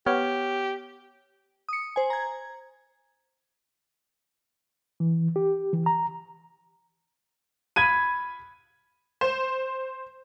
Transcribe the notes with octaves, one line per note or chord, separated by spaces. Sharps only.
B3 G4 C#5 F6
D#6 C#7
C5 G#5
A#5 G#6
E3
G4
E3
A#5
B5 G#6 D#7
C5